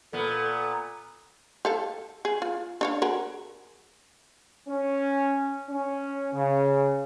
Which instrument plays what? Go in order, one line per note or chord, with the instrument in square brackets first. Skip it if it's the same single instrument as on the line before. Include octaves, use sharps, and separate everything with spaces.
[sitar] A#2 B3 [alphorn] A4
[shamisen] G4 A4 F5
G#4
F4
D4 C#5 F5
F#4 G#4 A#4
[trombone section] C#4
C#4
C#3